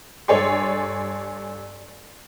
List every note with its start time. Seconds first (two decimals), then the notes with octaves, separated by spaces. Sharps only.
0.28 G2 A4 C#5 D5 G#5 C6